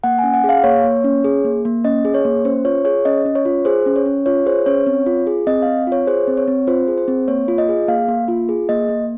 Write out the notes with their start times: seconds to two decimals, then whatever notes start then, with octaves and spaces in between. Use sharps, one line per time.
0.04 A#3 F#5
0.19 C#4 G#5
0.34 F#5
0.44 G#4 F5
0.64 A#3 C#5
0.84 A#3
1.04 C#4
1.24 G#4
1.45 A#3
1.65 A#3
1.84 C#4 D#5
2.05 G#4
2.14 C#5
2.25 A#3
2.45 C#4 C5
2.65 F4 C#5
2.85 G#4 C#5
3.05 C#4 D#5
3.25 C#4
3.35 C#5
3.45 F4
3.65 G#4 C5
3.86 C#4
3.96 C#5
4.06 C#4
4.26 F4 C#5
4.46 G#4 C5
4.66 C#4 C#5
4.86 C4
5.06 F4
5.27 G#4
5.47 C4 D#5
5.62 C4 F5
5.87 F4 C#5
6.07 G#4 C5
6.27 C4
6.37 C#5
6.48 C4
6.67 F4 C5
6.88 G#4
6.98 C5
7.08 C4
7.28 A#3 C#5
7.48 F4
7.58 D#5
7.69 G#4
7.88 A#3 F5
8.08 A#3
8.28 F4
8.49 G#4
8.69 A#3 D#5
8.89 A#3